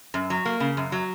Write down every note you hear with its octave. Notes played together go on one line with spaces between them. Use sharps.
F#2
F#3
A#3
C#3
F#2
F#3